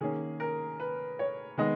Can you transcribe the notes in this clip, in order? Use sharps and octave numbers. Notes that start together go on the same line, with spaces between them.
D#3 A#3 C#4 G#4
A#4
B4
C#5
D#3 G#3 B3 D#5